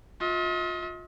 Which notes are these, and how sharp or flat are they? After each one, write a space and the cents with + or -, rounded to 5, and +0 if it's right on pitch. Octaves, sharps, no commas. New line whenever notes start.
F4 +25 D#5 +45